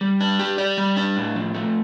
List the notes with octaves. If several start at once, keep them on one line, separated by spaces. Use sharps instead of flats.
G3
D4
G4
D5
G3
D4
A2
F3
A3